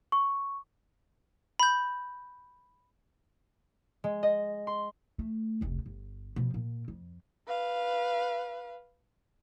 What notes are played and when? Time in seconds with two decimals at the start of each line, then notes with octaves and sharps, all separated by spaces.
0.12 C#6
1.60 B5 G6
4.04 G#3
4.23 D#5
4.67 C6
5.19 A3
5.61 F1 C#2
5.86 G1
6.36 B2 F3
6.54 A#2
6.88 F2
7.47 B4 F5